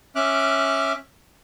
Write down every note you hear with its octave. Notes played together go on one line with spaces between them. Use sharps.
C#4 E5 D6 F6 F#6